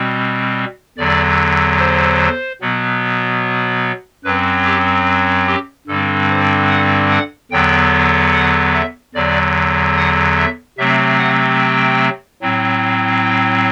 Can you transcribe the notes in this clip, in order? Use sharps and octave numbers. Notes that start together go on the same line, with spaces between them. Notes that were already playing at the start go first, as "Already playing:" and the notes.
Already playing: B2 G3 C4
E2 D3 F#3 D5
C5
B2 F#3 B3
F#2 F#3 C4 B4
G4
G4
G2 D3 G3 C4 A4
C5
F#5
F#5
E2 D3 F#3 B3 G5
F#5
E5
E2 D3 F#3 D5
F#5
E5
C3 F#3 A3 C4 E5
F#5
G5
A2 F#3 C4
G5